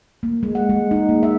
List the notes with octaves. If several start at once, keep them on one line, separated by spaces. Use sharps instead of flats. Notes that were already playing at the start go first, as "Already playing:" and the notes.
A#3
G#3
F#5
G#3
D#4
A#3
E5